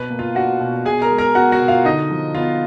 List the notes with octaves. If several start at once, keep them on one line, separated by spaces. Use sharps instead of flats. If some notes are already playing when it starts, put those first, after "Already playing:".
Already playing: B2 B4
A#3
F4 F5
D4 F#4 F#5
B2
B2 G#4 G#5
A#4 A#5
G#3
A#4 A#5
B3 F#4 F#5
F#4 F#5
B2
F4 F5
D3 D#4 D#5
F3
B3 F4 F5